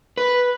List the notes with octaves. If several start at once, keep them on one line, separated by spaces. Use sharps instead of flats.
B4